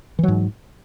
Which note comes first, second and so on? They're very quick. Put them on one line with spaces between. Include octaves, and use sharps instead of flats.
E3 F#3 G#2